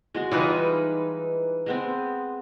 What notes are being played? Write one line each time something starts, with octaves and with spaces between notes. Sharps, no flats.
G#3 F#4 C6
E3 G3 G#3 D#4 F4 B4
G#3 B3 C4